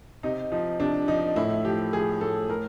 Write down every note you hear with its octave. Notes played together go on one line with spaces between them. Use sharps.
C3 D#4
F3 D#4
C3 D4
F3 D#4
A2 E4
F3 G4
F3 G#4
A2 A4
A2 A#4